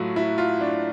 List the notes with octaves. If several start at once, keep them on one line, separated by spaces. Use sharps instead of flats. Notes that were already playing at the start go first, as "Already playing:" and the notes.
Already playing: A2 F#3 A3 F4 F#4
E4
F4
D4